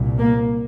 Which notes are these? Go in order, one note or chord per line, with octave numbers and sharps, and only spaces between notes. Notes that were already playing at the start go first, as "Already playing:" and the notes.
Already playing: C2 A#2
A#3